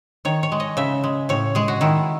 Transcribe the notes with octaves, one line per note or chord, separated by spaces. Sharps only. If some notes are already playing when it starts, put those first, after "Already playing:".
D#3 C#5
C#5
G#3
D#5
C#3 E5
G#3
A2 C#5
G#3 G#4
F#4
D#3 E4